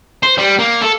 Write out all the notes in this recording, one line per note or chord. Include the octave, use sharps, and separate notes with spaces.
C5
G3
A#3
A4